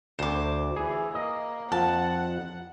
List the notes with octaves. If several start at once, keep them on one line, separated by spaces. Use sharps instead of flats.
D2 C5 D6
E3 G#4
A#3 D#5
F2 F#5 A5